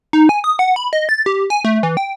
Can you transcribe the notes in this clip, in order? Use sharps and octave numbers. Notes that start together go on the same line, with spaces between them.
D#4
G#5
D#6
F#5
B5
D#5
A6
G4
G#5
A3
E3
G5